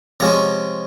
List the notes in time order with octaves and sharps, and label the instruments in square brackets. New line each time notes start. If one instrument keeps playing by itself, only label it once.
[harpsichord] C3 F3 G#3 C#4 A#5